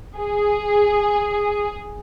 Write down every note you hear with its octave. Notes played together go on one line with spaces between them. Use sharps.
G#4